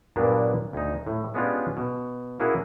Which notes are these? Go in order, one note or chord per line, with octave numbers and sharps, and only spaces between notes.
G2 A#2 F#3 A#3 B3 D4
D2 D#4
A2
G#3 B3 C#4 D4 F4 G4
B2
A#3 C#4 E4 F#4 G#4 A#4